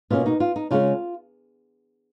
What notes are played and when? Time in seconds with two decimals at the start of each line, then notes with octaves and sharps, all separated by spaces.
0.10 B2 A#3 C#4 F4
0.26 D#4
0.40 F4
0.56 D#4
0.71 C#3 G#3 C#4 F4